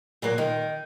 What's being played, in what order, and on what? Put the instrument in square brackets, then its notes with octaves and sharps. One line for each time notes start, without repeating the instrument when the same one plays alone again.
[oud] A#2 F#3 A#3
D#3